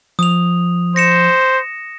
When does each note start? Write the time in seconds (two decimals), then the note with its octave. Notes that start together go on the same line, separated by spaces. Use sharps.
0.19 F3 D#6 F7
0.96 C5 A#6 C#7 E7